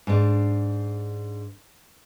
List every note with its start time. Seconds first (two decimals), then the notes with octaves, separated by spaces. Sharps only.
0.07 G#2 D4